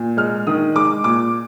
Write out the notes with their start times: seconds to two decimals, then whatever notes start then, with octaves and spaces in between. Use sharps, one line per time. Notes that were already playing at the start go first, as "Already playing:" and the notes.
Already playing: A#2
0.17 G#3 F6
0.47 D#3 D#6
0.76 G#3 D6
1.04 A#2 D6